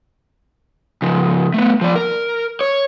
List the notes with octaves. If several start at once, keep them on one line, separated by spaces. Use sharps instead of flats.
C#3 F3
A3 B3
F3 D5
A#4
C#5